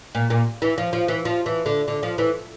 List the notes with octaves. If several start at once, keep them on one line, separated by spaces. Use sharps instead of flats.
A#2
A#2
E3
F3
F3
E3
F3
E3
D3
D3
F3
E3